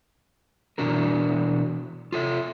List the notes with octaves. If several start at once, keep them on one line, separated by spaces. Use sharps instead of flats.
B2 E3 D4 F#4 A#4
F4 A4 E5